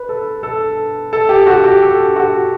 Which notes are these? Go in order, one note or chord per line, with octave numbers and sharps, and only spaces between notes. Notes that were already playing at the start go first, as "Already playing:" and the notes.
Already playing: B4
A4
A4
A4
G4
F#4
G4
A4
F#4